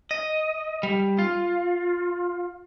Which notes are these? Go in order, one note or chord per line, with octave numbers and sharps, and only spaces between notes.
D#5
G3
F4